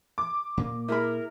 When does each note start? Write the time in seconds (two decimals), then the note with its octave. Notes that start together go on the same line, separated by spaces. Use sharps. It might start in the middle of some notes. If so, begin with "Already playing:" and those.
0.18 D6
0.57 A#2 A#3
0.88 E4 G#4 A#4 B5